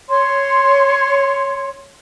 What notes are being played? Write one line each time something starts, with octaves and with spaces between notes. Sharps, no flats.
C#5 C6